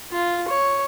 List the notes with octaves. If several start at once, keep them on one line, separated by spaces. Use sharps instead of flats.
F4
C#5